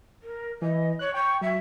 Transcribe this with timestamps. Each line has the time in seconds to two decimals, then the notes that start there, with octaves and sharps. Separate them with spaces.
0.22 A#4
0.61 E3 D#5
0.99 C#5 F#6
1.14 G5 C#6
1.41 F#3 E5